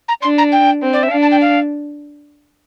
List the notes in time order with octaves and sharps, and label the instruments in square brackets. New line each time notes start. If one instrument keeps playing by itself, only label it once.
[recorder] A#5
[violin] D4 [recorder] C6
[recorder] A#5
G5
[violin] C4
[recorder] D5
E5
[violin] D4 [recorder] F5
[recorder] A5
G5
F5